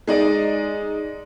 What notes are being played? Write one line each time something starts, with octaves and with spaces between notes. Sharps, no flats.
G#3 D#4 D5 D#5